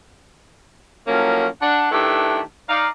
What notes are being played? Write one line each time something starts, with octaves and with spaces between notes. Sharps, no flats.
A2 F3 F#3 A#3 C#4
D4 F#5
D#3 A3 D4 E4 G4 B4
D#4 D5 F5